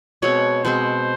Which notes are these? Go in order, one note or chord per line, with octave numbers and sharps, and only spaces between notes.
B2 G#3 C4 C#5
B2 G#3 C4 C5